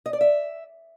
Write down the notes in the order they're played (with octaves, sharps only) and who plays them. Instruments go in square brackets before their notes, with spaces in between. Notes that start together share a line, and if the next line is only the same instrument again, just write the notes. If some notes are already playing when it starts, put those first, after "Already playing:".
[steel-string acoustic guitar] D#5
D5
E5